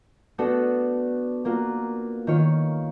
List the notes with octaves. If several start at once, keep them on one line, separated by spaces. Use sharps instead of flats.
A3 B3 D4 F#4 A4
A#3 F4 F#4
D#3 F4 C#5